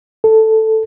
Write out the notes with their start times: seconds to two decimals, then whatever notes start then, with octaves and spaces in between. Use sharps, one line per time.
0.24 A4